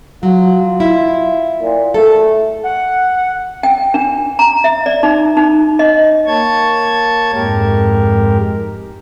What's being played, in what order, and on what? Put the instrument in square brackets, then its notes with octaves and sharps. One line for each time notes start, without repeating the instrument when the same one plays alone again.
[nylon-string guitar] F#3 [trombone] F4
[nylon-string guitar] E4
[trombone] A#2
[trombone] A3 [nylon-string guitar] A4
[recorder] F#5
[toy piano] G5
D4
A#5
E5
D5
D#4
D#4
D#5
[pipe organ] A#3 C#5 A5 C#6 G#6
F2 G#2 G#3 G4 A#4